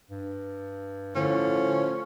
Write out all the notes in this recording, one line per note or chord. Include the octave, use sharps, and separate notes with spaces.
G2
A2 D3 F3 C#4